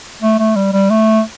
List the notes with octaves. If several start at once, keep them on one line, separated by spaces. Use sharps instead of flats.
A3
A3
G3
G3
A3